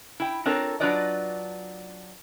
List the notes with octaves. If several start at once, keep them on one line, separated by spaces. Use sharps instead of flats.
E4 G5
C4 D4 F4 A4 A#4 C#5
F#3 D4 F4 B4 D5 D#5